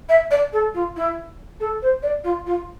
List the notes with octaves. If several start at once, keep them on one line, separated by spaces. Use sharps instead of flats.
E5
D5
A4
F4
E4
A4
C5
D5
F4
F4